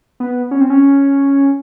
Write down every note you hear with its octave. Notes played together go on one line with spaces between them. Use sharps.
B3
C#4
C4
C#4